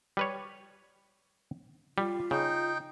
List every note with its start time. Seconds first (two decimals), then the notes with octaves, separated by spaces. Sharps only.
0.17 G3 B4 C#5
1.98 G3 F4
2.31 C#3 D#4 G5